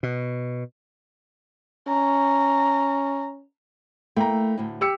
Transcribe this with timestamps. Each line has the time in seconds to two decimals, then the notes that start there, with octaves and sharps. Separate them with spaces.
0.03 B2
1.88 C#4 A#5
4.17 A3 A#3 E4 G5 A#5
4.58 D2 A2
4.81 G4 E6 C#7